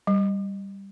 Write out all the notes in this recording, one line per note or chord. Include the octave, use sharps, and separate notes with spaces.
G3